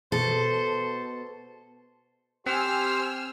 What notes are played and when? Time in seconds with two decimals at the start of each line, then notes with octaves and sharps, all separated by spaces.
0.12 B2 A4 C5
2.46 C4 G4 C5 G#5 E6 F6